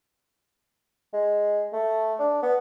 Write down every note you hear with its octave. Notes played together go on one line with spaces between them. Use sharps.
G#3
A3
D4
B3